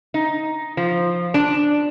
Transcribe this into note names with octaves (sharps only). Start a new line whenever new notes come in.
D#4
F3
D4